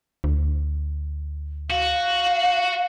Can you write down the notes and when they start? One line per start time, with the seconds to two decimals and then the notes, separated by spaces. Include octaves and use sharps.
0.24 D2
1.70 F#4 F5